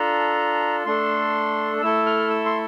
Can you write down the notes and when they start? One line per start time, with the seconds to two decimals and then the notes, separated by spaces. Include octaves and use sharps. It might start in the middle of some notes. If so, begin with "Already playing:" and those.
Already playing: D4 F4 A4 A#5
0.86 A3 D4 A4 C6
1.81 A3 E4 A4 E6
2.06 F6
2.30 E6
2.46 C6